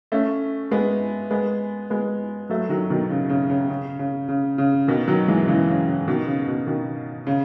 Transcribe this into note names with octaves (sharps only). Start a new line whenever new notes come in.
A3 C#4
G#3 B3
G#3 B3
G#3 B3
F#3 A3
D#3 F#3
B2 D#3
C#3
C#3
C#3
C#3
C#3
C#3
C#3
B2 D#3
D#3 F#3
E3 G#3
C#3 E3
C#3
C#3
B2 D#3
C#3
B2
B2 D#3
C#3